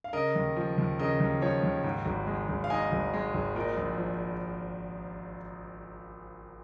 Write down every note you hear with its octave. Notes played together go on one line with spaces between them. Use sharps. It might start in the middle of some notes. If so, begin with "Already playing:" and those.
F5
C#3 A#4 D#5
D#2
F3
D#2
C#3 A#4 D#5
D#2
F3 C#5
D#2
G#2
G#1
G#3
G#1
F5
G#2 D#5 G#5
G#1
G#3
G#1
A#2 A#4 D#5
A#1
F3